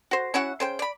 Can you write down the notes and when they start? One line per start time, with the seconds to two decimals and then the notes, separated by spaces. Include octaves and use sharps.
0.11 F#4 C5
0.34 C#4 E4 F#4 F#5
0.60 C#3 C5 G5
0.79 D5 B5